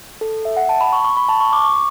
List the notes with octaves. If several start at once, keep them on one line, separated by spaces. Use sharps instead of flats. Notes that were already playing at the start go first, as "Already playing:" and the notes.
A4
E5
F#5
A5
B5
C#6
C#6
B5
A5
C#6
D6
C#6